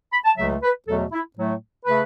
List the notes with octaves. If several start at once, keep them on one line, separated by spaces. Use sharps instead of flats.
B5
A5
C#2 C#3 F#3 A3 E5
B4
E2 B2 F#3 A3 A4
E4
A2 F#3 A3
C#3 A3 B4